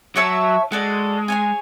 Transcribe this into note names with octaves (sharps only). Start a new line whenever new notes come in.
F#3 F#4 C#5 E5 A5
G#3 F#4 A4 D5
G#4 C#5 G#5